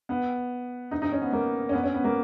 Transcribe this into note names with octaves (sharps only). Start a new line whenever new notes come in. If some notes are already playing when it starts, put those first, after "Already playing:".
B3
D#4
D#4
C#4
B3
A#3
C#4
B3
C#4
B3
A#3